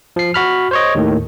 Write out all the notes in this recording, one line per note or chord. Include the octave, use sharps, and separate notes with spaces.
F3 C7
F#4 B5 F6
C5 C#5 D#5
D#2 A2 D#3